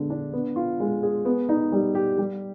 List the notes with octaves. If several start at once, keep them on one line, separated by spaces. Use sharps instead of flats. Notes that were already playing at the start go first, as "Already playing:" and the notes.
Already playing: D3 G#3 B3
D4
B3
F4
G#3
G#4
B3
D#4
G3
G4
G3